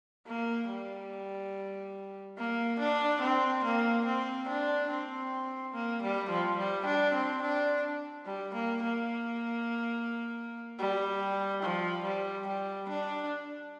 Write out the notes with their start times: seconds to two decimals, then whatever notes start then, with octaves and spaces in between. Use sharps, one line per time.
0.27 A#3
0.70 G3
2.38 A#3
2.80 D4
3.21 C4
3.64 A#3
4.05 C4
4.48 D4
4.90 C4
5.74 A#3
6.02 G3
6.30 F3
6.58 G3
6.85 D4
7.14 C4
7.42 D4
8.26 G3
8.54 A#3
8.83 A#3
10.79 G3
11.63 F3
12.04 G3
12.47 G3
12.89 D4